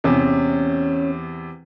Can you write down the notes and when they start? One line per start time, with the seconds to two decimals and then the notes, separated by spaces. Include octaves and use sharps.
0.04 E2 C3 C#4